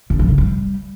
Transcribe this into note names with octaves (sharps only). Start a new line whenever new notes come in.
D3
F3
C#3
G3